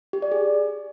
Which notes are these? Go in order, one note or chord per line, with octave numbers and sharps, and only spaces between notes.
G4
D5
G#4